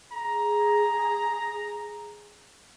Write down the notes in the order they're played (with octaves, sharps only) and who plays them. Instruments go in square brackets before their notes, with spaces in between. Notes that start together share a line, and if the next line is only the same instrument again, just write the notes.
[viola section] G#4 [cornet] A#5